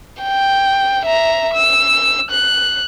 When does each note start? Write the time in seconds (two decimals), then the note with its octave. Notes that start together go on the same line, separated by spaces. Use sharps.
0.22 G5
1.06 E5 A#5
1.54 E6
2.31 F#6